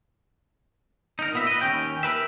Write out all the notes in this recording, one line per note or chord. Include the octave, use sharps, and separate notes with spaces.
D#4 A#4
A#2 B3 E5
B4 D#5
D#2 C#4 G5
A#4 B4 E5